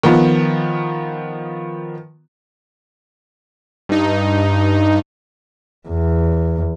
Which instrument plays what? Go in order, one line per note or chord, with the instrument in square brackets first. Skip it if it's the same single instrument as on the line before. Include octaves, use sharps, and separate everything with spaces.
[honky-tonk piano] D#3 F3 B3
[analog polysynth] G2 D#4
[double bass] E2